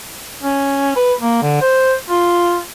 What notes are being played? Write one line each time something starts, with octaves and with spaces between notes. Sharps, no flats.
C#4
B4
A#3
D3
C5
F4